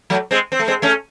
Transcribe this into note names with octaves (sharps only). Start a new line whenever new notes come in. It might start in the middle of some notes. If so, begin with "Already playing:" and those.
F#3 A3
G#3 C4
C4
A3
G#3 C4
A3 C#4